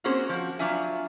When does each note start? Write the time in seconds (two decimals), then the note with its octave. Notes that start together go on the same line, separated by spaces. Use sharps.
0.04 A#3 C4 C#4 F#4 G#4 C5
0.29 F3 F#4
0.59 F#3 D4 F4 E5 G#5